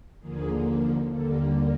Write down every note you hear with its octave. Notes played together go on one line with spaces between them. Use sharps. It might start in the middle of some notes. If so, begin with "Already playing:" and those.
D#2 D3 F3 A#3 G#4
D#2 D3 G3 A#3 A4